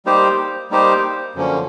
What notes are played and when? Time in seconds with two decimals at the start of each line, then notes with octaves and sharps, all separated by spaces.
0.05 G3 A#3 D#4 G4 C5
0.70 G3 A#3 D#4 G4 C5
1.35 F#2 D3 F3 A#3 C#4